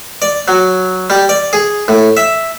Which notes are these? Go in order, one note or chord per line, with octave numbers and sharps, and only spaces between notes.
D5
F#3
G3
D5
G#4
A2
E5